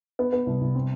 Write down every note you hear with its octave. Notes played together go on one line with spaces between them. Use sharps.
B3
B3
C2
C2
C4